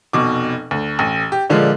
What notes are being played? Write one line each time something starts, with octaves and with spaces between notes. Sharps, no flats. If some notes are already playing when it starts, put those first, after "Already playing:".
F1 B2 D6
D2
A1
G4
A#2 D3 F3 G#3